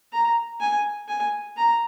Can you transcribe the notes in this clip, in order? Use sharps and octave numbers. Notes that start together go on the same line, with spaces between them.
A#5
G#5
G#5
A#5